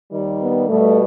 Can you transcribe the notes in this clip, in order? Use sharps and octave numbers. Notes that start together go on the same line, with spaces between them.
D#2 D#3 G3
B3
B2 G3 A3